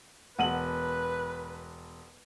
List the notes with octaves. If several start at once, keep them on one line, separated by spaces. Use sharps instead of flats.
E1 B4 F#5 D#7 F#7